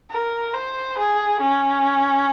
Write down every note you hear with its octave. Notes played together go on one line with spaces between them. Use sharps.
A#4
C5
G#4
C#4